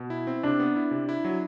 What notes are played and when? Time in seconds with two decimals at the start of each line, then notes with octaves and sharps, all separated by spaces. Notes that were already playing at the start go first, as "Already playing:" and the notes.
Already playing: B2
0.10 E4
0.27 C4
0.43 C3 D4
0.60 B3
0.76 E4
0.91 C3
1.09 E4
1.25 F#3